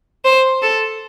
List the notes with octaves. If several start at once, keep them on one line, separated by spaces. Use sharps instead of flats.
C5
A4